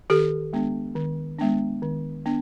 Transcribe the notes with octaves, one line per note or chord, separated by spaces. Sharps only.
D#3 G4 A4
G#3 B3 D4
D#3
G#3 B3 D4
D#3
B3 D4